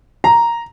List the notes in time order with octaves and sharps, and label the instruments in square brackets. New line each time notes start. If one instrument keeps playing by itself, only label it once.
[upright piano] A#5